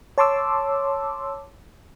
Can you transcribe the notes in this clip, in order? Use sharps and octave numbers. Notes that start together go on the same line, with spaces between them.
C#5 A5 C6 D6 E6